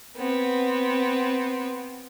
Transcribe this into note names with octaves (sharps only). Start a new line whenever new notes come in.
B3 C4